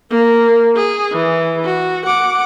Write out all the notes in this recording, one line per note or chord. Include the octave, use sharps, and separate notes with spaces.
A#3 A#4
G#4
E3
F#4
F#5 D6